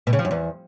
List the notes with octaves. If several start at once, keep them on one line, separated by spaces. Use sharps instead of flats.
B2
C#3
F3
F#2
E2